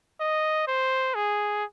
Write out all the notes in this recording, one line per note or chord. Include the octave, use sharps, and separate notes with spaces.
D#5
C5
G#4